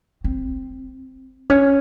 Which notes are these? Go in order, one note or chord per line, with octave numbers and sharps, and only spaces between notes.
C4
C#4